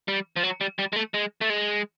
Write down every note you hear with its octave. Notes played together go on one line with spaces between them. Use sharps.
G3
F3
F#3
G3
G3
G#3
A3
G#3
A3
G#3